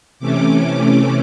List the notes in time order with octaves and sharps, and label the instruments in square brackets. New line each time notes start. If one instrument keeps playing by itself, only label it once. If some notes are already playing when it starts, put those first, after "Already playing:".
[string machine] C3 E3 A3 C#4 D6